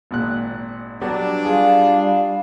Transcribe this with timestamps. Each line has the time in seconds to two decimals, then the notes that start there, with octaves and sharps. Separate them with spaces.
0.11 G#1 A#2 F#6
1.01 F#3 G3 B3 D4
1.45 G3 F4 G#4 F5